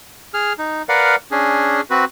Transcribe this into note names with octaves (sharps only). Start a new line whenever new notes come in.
G#4 F6
D#4
A#4 B4 D5 F5 F#5
C#4 D4 G#4
C4 F#4 B4